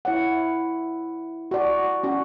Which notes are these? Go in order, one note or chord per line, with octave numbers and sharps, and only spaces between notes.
E4 C#5 F#5
F#4 D5
C#4 F#4